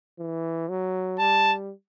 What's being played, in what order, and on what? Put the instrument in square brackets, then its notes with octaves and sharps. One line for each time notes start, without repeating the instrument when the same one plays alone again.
[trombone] E3
F#3
[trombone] G3 [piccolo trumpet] A5